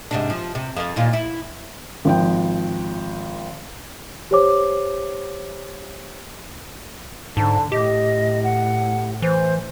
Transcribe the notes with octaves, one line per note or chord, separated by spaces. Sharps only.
G#2 C3 D4
F3
C3
F2
D#2 A#2 F4
E4
G#1 F3 G5
G4 C5 C#5 D6
G#2 D3 A5
A2 G4 D#5
F#5
E3 C5